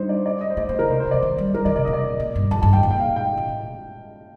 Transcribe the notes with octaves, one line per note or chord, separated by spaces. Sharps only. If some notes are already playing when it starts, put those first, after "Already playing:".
Already playing: G3 D4 D#4 C5
D5
D5
D#5
C5
A3 D5
A3 C5
D3 A#4
C3 C5
C5
C3
D#3 D5
D#3
G3
G3 A#4
D#3 D5
C3 D5
A#2 D#5
D5
A#2
G2
F2 A5
G2 A5
A2 G5
A#2
G5
F5
G5
A#2
A2